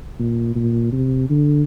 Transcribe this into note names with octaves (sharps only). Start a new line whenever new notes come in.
A#2
A#2
C3
D3